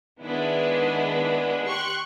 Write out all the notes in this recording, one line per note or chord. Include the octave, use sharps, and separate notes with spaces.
D#3 G#3 B3 D4 E4
G4 C6 C#6 F#6